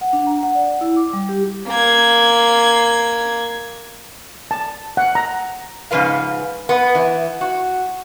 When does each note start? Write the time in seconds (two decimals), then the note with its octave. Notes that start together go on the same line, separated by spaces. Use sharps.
0.01 F#5
0.13 D4
0.27 A#5
0.43 F#5
0.55 D5
0.81 E4
0.96 D6
1.13 G3
1.29 G4
1.68 A#3 G#6
4.51 A5
4.97 F#5
5.15 A#5
5.91 G#2 C#3 F3 B4 F5
6.69 B3
6.95 E3
7.41 F#4